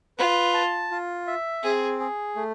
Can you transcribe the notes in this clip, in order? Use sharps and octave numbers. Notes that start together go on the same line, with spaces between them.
F4 B4
A5
F4
E5
C4 G#4
G#4
A3